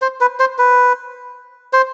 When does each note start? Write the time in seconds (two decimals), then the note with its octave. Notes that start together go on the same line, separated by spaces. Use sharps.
0.02 C5
0.21 B4
0.40 C5
0.58 B4
1.73 C5